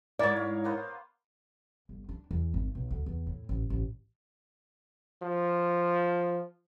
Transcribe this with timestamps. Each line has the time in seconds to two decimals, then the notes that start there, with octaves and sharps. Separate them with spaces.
0.19 G#2 E4 A#4 C#5 D5
0.36 F5
0.64 A#3 B3 C5
1.89 G1
2.09 D4
2.31 E2
2.54 G#1
2.75 B1
2.91 D2
3.06 E2
3.27 A2
3.49 A1
3.70 A1
5.23 F3